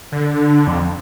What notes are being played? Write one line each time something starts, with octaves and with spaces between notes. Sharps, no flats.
D3
F2